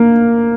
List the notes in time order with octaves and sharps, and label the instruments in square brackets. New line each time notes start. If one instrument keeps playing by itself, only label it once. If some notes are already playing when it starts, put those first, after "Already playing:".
Already playing: [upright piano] A#3